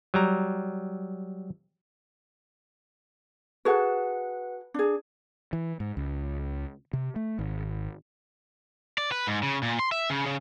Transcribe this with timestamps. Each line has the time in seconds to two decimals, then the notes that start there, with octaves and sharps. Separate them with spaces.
0.14 F#3 G3 A#5
3.65 F#4 G#4 A4 B4 F#5
4.74 D4 G#4
5.53 E3
5.80 G#2
5.97 C#2
6.93 C3
7.16 A3
7.39 G#1
8.98 D5
9.12 B4
9.27 G#2
9.43 C#3
9.63 A#2
9.79 C6
9.92 E5
10.10 C#3
10.26 C#3